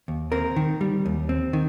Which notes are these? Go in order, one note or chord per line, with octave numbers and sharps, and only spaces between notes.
D#2
C4 A#4
D#3
G3
D#2
C4
D#3